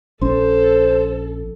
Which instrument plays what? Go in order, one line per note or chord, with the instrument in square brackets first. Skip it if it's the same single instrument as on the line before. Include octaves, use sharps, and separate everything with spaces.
[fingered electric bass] A#1 C#4 [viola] A4 [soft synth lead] C5